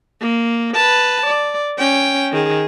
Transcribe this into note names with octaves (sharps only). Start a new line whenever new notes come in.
A#3
B4 A5
D5
C#4 G5
D#3 G#4